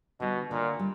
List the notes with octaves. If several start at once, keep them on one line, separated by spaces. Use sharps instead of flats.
B2 D3 G3
A#2 D3
G3